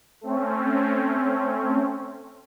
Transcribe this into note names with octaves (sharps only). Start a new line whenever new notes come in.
A3 C4 C#4